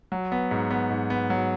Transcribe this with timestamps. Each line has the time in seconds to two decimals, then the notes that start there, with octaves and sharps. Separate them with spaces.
0.12 F#3
0.32 B3
0.51 G#2
0.71 B3
0.90 G#2
1.10 B3
1.30 F#3